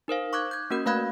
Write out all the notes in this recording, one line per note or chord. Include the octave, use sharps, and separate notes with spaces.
D#4 A#4 C5 F5
C#6 D6 F#6 G#6
G6 G#6
A#3 C#4 F#4 A#4 G6
A3 B4 F5 B5 F#6 G#6